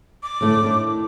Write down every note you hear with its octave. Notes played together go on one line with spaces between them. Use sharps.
D6
A2 D3 A3
A2 D#3 D4